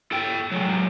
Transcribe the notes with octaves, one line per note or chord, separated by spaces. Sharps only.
A4 G5
F#3 G#3